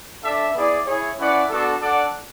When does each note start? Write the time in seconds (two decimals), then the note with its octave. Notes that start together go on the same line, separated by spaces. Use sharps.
0.23 D4 A4 E5
0.54 B3 E4 G#4 D5
0.86 E4 G#4 C#5
1.17 C#4 E4 B4 D5 F#5
1.49 B3 D4 F#4 A4
1.81 D4 A4 D5 F#5